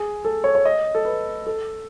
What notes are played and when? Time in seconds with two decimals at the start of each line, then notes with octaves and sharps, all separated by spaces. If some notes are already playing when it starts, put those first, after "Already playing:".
Already playing: G#4
0.25 A4
0.44 C#5
0.55 C#5
0.65 D#5
0.95 A4
1.05 B4
1.47 A4